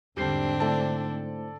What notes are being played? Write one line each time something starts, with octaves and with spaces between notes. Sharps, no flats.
E2 G#2 D3 G3 C4 D4 G6 C7
A3 E4 A4 C5 D5 A5